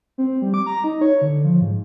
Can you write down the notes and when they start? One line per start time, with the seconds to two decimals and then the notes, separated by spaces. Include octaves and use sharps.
0.18 C4
0.42 G3
0.54 D6
0.66 A#5
0.84 D#4
1.01 C#5
1.21 D3
1.44 F3
1.61 G#2